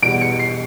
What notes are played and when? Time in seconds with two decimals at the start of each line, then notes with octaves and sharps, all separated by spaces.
0.02 E2 B2 G3 D7
0.21 C#7
0.39 C7